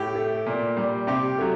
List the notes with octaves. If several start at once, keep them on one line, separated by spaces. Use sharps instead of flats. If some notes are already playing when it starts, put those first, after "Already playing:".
Already playing: A2 G4
A3
A#2
G3
C3 G4
F#3 A3